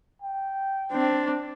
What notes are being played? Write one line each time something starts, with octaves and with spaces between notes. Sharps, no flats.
G5
C4 D4